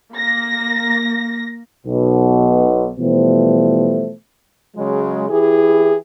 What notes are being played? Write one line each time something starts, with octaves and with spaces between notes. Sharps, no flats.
A#3 A#6
B1 B2
B2 E3 F3 G3 A3 C5
C#3 F#3 G#3
E3 E4 G4 G#4